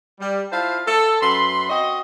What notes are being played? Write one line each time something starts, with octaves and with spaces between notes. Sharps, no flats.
G3
E4 F4 C5 F5 A5
A4
F#2 B4 B5 C6
C4 F#4 D#5